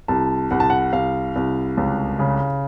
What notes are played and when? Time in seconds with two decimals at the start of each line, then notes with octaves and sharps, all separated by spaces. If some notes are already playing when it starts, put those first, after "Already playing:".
0.08 C2 A5
0.51 C2 F#5
0.60 A5
0.70 F#5
0.93 C2 F5
1.35 C2
1.77 C#2
2.19 C#3